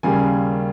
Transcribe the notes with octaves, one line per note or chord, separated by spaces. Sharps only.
D#2 C#3 G3 A#3 G#5